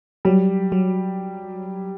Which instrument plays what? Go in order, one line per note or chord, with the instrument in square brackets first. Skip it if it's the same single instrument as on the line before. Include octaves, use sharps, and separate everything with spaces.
[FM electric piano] F#3 [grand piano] G3
[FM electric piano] F#3